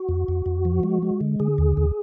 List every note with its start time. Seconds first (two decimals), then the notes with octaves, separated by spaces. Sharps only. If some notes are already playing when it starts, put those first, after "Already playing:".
Already playing: F#4
0.09 F2
0.28 F2
0.46 F2
0.65 F3
0.83 G#3
1.02 G#3
1.21 D3
1.40 D3 G#4
1.58 D#2
1.77 D#2